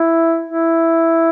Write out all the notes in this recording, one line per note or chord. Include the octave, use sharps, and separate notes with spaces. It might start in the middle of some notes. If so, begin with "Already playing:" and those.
Already playing: E4
E4